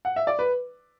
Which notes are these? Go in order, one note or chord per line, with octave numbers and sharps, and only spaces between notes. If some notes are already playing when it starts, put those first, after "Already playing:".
F#5
E5
D5
B4